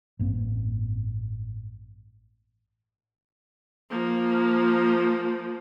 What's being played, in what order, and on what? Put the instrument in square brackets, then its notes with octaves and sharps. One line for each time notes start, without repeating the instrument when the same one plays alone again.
[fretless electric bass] A1 G2 A#3 C4
[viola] F3 A#3